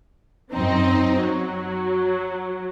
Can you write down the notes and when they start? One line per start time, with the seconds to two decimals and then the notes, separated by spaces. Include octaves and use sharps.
0.53 F#2 C4 D#4
1.20 F#3